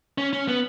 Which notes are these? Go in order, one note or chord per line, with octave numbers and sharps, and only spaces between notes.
C#4
C#4
B3